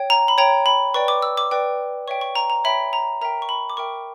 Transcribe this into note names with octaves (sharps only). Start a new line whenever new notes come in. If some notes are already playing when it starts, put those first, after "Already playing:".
Already playing: C#5 G5
A#5
B5
C#5 G5 A#5
B5
B4 D5 G5 C#6
D6
E6
D6
B4 D5 G5
C#5 E5 G5 C#6
C#6
A#5
A#5
C#5 E5 G5 B5
A#5
A#4 E5 G5 A#5
C#6
B5
D6
A#4 E5 G5 C#6